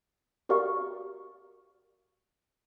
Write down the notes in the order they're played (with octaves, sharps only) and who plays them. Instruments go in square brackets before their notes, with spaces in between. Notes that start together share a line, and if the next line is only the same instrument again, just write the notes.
[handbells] F#4 G4 A#4 D5 F5 C#6